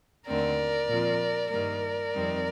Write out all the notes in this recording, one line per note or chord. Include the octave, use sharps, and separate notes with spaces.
D#2 D3 A3 C4 A#4 D5
A#2 F3 C4 F4
G2 D#3 G3 A#3 A#4 D5
F2 D#3 G3 C4